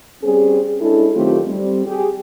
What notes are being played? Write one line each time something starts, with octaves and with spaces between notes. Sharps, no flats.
G3 C4 C#4 G#4
G#3 C#4 D4 E4 A4
D#3 F#3 A3 C4 F4 G4
G3 C4
G4 G#4